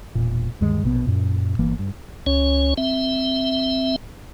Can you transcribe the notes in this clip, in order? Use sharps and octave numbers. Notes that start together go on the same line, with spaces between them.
E1 A#2
D2 G2 D#3 G#3
A#1 B2 B3
F#2 A#2
G1 E3 A#3
G2
C#2 C#4 C#5
C4 E5